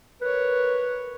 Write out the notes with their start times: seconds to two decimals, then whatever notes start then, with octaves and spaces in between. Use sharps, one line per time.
0.21 A#4 B4 C#5